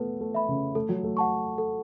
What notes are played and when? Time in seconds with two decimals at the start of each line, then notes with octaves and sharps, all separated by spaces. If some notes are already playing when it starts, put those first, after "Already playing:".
Already playing: A3 B3 B4
0.21 A3
0.35 E5 B5
0.49 C#3
0.75 A3 A4
0.89 F#3
1.04 A3
1.17 F#5 A5 C#6
1.58 A4